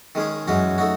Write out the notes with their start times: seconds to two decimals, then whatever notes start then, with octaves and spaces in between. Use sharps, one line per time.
0.15 D#3 G#3 C#4 G#4
0.47 F#2 E3 G#3 C#4 F#4
0.78 A3 D#4 F#4